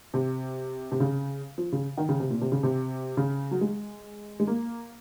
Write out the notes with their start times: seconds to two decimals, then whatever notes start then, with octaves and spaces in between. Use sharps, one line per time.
0.14 C3
0.92 C3
1.00 C#3
1.58 F3
1.72 C#3
1.97 D#3
2.09 C#3
2.20 C3
2.30 A#2
2.42 C3
2.52 C#3
2.63 C3
3.17 C#3
3.51 F#3
3.61 G#3
4.40 G#3
4.47 A#3